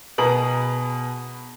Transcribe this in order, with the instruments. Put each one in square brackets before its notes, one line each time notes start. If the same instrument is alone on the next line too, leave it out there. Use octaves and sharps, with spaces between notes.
[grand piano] B2 B3 G#4 A#5 D#6 F#7